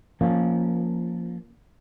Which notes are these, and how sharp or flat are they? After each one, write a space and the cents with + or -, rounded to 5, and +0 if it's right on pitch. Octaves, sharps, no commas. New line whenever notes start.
F3 +0 A#3 +0 C#4 +5